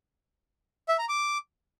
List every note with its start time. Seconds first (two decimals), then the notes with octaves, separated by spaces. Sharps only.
0.88 E5
0.98 A#5
1.09 D6